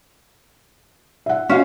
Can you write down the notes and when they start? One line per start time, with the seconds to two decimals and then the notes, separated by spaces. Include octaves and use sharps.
1.26 E5 F#5
1.49 C#4 F4 F#4 F5